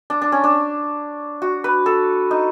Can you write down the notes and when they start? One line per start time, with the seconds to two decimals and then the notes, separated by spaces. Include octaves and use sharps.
0.10 D4
0.22 D4
0.32 C#4
0.44 D4
1.42 F#4
1.64 B4
1.86 A4
2.31 D#4